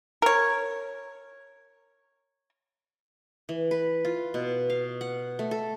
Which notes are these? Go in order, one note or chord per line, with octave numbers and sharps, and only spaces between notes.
A#4 C#5
E3
B4
F4
B2
F5
F#5
A3
A4